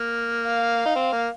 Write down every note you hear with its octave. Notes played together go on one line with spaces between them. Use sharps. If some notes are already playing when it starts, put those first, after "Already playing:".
Already playing: A#3
F5
D#4
C4
A#3